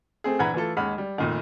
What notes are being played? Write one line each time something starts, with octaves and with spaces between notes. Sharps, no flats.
A3 C4 G#4
A#1 E3 F#5 A#5 B5 G#6
E3 A3 F4 A4
D#2 G#3 F#5 B5 F6
G3
F1 A#2 D#3